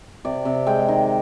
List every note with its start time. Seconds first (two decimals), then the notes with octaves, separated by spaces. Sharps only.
0.25 C3 D5
0.45 C3
0.67 G#3 G5
0.88 D#3